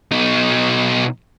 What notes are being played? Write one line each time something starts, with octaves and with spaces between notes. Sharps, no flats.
B2 D#4